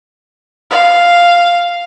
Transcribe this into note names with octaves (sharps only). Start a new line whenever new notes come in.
F5